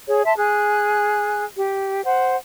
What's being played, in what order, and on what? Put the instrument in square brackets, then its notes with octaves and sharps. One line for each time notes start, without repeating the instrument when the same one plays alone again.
[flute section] G#4 C#5
E5 A5 C6
G#4 G#5 F#6
G4
C5 F#5